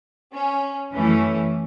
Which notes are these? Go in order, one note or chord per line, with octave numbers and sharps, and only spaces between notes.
C#4
F#2 E3 A3 C#4